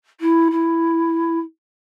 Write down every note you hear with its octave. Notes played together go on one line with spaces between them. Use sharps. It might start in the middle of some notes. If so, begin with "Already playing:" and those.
E4
E4